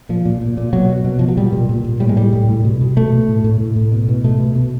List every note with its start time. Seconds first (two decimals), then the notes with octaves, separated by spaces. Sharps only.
0.09 A#2 F3
0.25 A#2
0.41 A#2
0.57 A#2
0.73 B2 F#3
0.89 B2
1.04 B2
1.19 B2 F3
1.28 F#3
1.37 A#2 G3
1.52 A#2
1.69 A#2
1.84 A#2
2.00 A2 G3
2.09 G#3
2.16 A2 G3
2.32 A2
2.49 A2
2.65 B2
2.81 B2
2.97 B2 A3
3.12 B2
3.29 A2
3.44 A2
3.61 A2
3.76 A2
3.92 B2
4.08 B2
4.24 B2 A3
4.40 B2
4.56 B2